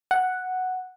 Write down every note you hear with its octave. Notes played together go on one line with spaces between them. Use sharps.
F#5